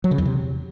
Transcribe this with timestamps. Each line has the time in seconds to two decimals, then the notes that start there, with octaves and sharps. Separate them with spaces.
0.04 F#3
0.11 C#3
0.18 E2
0.25 C3